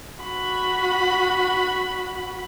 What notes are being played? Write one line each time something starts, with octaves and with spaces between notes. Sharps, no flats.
F#4 B5